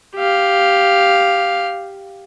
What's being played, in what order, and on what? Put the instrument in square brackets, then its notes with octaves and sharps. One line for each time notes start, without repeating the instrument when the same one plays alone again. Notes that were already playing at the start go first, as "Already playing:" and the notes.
[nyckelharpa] G4 F5